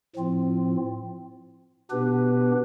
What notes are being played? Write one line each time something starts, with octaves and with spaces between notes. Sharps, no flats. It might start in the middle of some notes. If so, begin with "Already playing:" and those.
A2 F3 C4 F4
B2 B3 D4 G4 B4